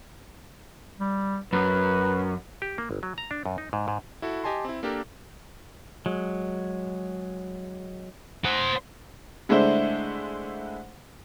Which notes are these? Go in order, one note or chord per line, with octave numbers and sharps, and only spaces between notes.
G3
F#2 B4
G4
A#3
G1
F#3
A#5
D4
F#2
D#4
G#2
G#2
E4 F#4 A4
G4 D#5 G#5 A5 C6
C4 E4
A#3 D4 G4 A4 A#4
F#3 G#3
C5 F#5
D3 G#3 A3 D4 E4 C5